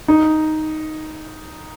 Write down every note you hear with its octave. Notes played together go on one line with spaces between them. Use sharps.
D#4